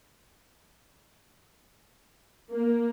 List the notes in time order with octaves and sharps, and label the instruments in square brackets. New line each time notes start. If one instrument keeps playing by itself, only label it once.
[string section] A#3